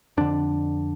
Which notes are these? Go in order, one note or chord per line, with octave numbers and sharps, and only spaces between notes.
F2 D3 D4